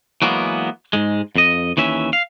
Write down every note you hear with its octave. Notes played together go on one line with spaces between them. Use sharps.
E3 F#3 G#3 A#3 B3
G#2 G#3
F2 D#5
D#2 E3 C#4 E5
F5